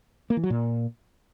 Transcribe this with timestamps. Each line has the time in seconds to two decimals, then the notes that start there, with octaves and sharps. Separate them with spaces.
0.30 A#3
0.37 E3
0.44 F#3
0.50 A#2